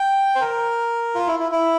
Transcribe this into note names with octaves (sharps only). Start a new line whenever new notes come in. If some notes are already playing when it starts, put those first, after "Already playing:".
Already playing: G5
C5
A#4
F4
E4
E4
E4